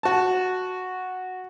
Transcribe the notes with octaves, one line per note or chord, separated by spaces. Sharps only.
F#4 A5